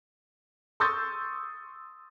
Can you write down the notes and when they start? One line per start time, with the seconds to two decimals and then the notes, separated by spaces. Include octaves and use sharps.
0.80 C6 C#6 D#6 E6 G6 A6